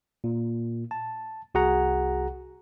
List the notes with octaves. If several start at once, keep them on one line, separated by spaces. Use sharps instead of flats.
A#2
A5
C2 F#4 G#4 F#5 A#5